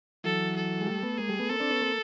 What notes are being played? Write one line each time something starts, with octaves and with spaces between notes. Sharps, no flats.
E3 F#3 A4
A4
G#3
G3 A3
A3 B3
G#3 A#3 G#4
G3 A3
A3 B3
A#3 C4 A4
C4 D4
B3 C#4
A#3 C4